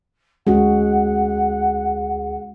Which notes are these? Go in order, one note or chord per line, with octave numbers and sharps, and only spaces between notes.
D2 G#3 C#4 F#4 G#4 F#5